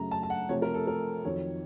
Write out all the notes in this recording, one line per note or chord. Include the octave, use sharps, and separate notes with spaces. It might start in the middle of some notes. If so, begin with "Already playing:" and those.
Already playing: F#2 C#3 A3 A#5
A5
A5
F#5
C3 F3 A3 C#5
A#4
A4
A#4
F2 D#3 F#3 C#5